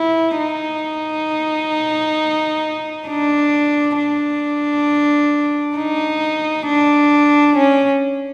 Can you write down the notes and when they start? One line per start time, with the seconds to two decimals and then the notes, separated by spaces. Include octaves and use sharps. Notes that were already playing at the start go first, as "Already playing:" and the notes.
Already playing: E4
0.38 D#4
3.08 D4
3.98 D4
5.77 D#4
6.67 D4
7.57 C#4